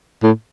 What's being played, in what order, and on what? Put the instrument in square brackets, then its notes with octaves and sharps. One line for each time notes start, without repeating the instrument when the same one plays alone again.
[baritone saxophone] A2